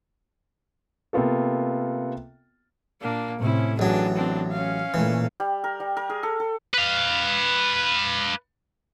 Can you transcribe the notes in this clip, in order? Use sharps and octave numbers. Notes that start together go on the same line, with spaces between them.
C3 A#3 B3 F4 A4
A#2 A#3 D4
A2 C3 C#4 E4
A1 E3 F#3 D4 G#4
C4 D4
C#4 F5
A#2 E3 A3
G3
A#4
G3
A#4
G#4
A4
A4
B4 F5